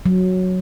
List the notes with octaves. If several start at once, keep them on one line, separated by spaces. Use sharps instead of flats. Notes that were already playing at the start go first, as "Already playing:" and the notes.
F#3